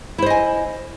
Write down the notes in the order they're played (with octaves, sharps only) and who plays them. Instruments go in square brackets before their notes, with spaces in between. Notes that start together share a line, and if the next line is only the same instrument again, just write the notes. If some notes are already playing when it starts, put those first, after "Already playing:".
[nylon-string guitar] E4
C5
D#5
G#5